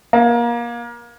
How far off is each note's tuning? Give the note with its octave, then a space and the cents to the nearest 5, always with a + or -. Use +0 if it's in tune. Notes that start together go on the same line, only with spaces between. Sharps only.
A#3 +30